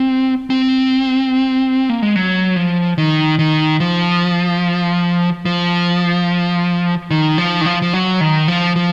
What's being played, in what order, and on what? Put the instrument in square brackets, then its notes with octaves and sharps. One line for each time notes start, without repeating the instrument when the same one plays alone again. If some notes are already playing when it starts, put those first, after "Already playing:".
Already playing: [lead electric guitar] C4
C4
A#3
G#3
F#3
F3
D#3
D#3
F3
F3
D#3
F3
D#3
F3
F3
F#3
D#3
F3
F3